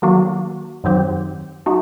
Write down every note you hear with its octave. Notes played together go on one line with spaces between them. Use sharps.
D#3 F#3 A#3 D4 F#4
F#2 D#3 F#3 C4 G4
F#3 A3 D#4 F#4